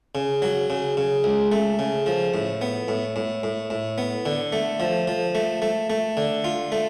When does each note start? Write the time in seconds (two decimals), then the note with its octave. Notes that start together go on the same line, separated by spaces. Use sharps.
0.15 C#3
0.42 F#3
0.70 C#3
0.97 C#3
1.24 C#2
1.52 A3
1.79 C#3
2.06 F3
2.34 A2
2.61 B3
2.88 A2
3.16 A2
3.43 A2
3.70 A2
3.98 B3
4.26 D3
4.53 A3
4.80 F3
5.07 F3
5.35 A3
5.62 A3
5.90 A3
6.17 D3
6.44 F4
6.72 A3